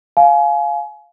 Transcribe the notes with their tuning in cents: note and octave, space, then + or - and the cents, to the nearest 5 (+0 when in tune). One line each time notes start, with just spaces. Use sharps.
F5 +0 G#5 +30